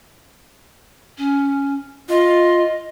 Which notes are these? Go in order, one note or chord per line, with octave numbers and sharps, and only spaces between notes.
C#4
F4 D#5